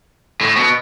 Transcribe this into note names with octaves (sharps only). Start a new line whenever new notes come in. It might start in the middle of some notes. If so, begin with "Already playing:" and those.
A2
B2